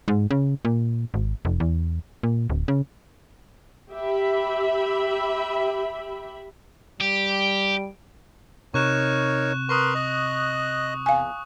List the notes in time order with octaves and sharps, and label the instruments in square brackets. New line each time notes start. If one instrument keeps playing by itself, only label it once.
[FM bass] G#2
C#3
A#2
G#1
F1
E2
A#2
D1
C#3
[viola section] G4 E5 B5
[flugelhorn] G3 [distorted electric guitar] G4
[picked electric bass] C3 [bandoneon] D#4 A#4 C#5 [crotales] C#6 F#6 E7
[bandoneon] A#4 B4 C6 [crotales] C#6 D#6
[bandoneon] D#5 F#6
[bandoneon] E2 [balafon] F5 G#5